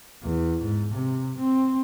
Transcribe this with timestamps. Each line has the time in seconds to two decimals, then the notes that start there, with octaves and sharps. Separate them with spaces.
0.24 E2
0.63 G#2
0.95 C3
1.39 C4